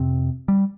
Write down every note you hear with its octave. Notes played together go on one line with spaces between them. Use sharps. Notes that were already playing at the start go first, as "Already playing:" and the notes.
Already playing: F2 C3 C4
G3